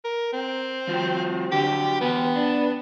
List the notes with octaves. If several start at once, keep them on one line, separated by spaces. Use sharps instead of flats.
A#4
C4
F3 F4 F#4
D3 F#3 G4
E2 B3 G5
D4